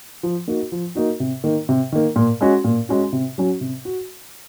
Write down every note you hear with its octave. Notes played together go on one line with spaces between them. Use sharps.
F3
A#3 D#4 F#4
F3
A#3 D#4 F#4
C3
D#3 A#3
C3
D#3 A#3
A#2
G#3 C#4 F#4
A#2
G#3 C#4 F#4
C3
F#3 C#4 F#4
C3
F#4